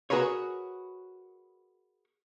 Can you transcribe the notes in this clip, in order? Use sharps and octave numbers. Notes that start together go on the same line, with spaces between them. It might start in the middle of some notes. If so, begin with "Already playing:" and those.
F#4 G#4 A#4 B4 C#5